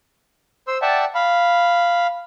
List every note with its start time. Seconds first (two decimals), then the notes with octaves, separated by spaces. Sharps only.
0.68 C5 C6 E6
0.82 D5 E5 F#5 G5 A5
1.15 F5 B5